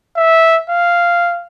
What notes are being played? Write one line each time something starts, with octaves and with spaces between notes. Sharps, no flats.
E5
F5